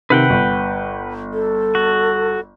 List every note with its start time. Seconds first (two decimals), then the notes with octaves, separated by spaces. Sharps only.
0.10 C3 D#3 B4 F#5 G5
0.30 G1
1.34 A4
1.75 F#4